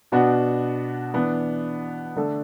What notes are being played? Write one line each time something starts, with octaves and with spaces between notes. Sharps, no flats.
B2 B3 D4 F#4
E3 B3 D4
D3 A3 D4 A4